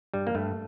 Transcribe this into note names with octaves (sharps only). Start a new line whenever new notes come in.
G2 G3
A#3
G2 A3